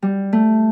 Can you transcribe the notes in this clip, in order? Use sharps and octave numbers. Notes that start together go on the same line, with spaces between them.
G3
A3